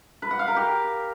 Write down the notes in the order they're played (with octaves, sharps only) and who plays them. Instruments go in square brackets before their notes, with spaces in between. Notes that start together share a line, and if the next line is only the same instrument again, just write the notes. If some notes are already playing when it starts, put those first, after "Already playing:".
[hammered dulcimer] B4
F#5
F5
A#4
G4